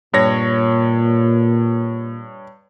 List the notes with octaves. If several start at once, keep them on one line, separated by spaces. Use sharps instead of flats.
G2 A#2 C#5 A#6